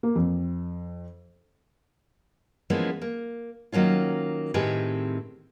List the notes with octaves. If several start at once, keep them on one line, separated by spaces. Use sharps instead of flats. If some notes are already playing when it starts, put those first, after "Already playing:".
A#3
F2
E3 F3 G#3 A#3 B3 C#4
A#3
D#3 F#3 A#3 C#4 F4
A2 D#3 C4 G4 G#4 B4